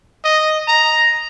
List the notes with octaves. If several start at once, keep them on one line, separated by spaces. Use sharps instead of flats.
D#5
A#5